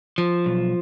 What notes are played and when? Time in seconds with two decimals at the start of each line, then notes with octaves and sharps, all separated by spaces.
0.18 F3
0.46 B1